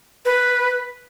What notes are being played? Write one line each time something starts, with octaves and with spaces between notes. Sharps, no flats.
B4